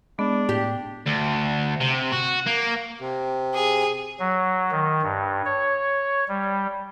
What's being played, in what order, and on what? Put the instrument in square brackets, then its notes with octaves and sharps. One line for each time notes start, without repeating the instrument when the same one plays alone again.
[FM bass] G#3 [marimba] B3 [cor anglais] D4
[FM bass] A2 [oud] G4
[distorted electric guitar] D2
C3
F#4
A#3
[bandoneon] C3
[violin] G#4
[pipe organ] F#3
D#3
G2
C#5
G3